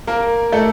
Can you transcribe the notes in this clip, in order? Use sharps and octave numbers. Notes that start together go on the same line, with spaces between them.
A#3 A#4
A3 A4